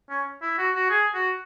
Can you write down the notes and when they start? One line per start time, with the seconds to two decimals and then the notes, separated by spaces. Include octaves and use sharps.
0.10 C#4
0.42 E4
0.58 F#4
0.75 F#4
0.90 G#4
1.15 F#4